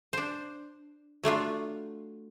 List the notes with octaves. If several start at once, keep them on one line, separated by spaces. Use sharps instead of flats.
D4 C5
F#3 A3 D4 F4